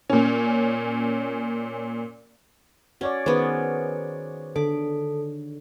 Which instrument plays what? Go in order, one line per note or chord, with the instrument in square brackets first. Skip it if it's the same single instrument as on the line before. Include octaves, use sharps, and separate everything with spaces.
[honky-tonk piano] A#2 C#4
[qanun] C#4 [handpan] F#4 C#5 D5
[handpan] D#3 G#4 [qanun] B3 C#4 [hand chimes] C5
[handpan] D3 [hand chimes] A4 [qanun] D6